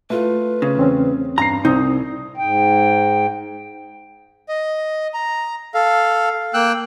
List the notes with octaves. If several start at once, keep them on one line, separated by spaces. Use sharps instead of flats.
A3 E4 F4 B4
C#3
E2 C4 C#4
G2 A#5 C7
C2 C4 D#4 D#6
G#2 G5
D#5
A#5
A4 F5
A#3 G5 E6 F#6